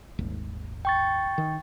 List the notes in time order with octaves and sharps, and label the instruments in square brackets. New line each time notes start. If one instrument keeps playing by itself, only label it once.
[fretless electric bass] D#1 G#1 D#2
[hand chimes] G5 C#6 A6
[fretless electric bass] D#3